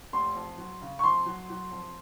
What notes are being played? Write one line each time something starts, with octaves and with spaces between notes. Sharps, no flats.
F1 C6
F2
F#3
C#3
C#6
F2 C6
F#3
F#3
F2